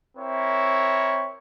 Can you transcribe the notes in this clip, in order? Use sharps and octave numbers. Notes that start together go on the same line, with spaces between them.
C4 E4 A#4 C#5